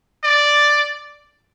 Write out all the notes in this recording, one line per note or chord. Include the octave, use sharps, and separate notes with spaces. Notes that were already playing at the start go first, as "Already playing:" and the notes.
D5